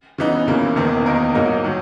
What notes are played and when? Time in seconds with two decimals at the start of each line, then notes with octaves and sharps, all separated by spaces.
0.18 C#3 E3 B3 D#4
0.47 C#2 C#3 E3 A#3
0.76 E1 E2 D#3 A#3
1.06 E2 D#3 A#3 D#4 A#4
1.34 G#2 F#3 A#3 D#4
1.64 D#3 F#3